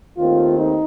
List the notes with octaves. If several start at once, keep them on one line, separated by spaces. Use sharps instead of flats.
D#2 D#3 A3 C4 F4
D#4